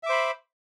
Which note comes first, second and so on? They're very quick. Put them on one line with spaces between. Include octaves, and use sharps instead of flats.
E5 D6 C5 B5